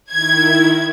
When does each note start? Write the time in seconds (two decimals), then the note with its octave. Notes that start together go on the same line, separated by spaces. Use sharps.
0.11 D#3 E4 G#6